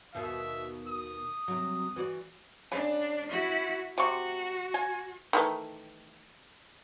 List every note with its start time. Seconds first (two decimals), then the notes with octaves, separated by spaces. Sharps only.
0.15 D#2 B2 D#3 E5
0.88 D#6
1.48 C3 F#3
1.96 E3 F#4 D5
2.72 C#3 D4
3.29 E4 F#4
3.98 C3 F#4 C#6
4.74 G#5
5.33 D#3 E3 A3